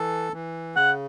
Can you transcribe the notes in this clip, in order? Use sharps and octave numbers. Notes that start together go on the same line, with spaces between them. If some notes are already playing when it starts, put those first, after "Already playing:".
Already playing: E3 A4
E3
C#3 F#5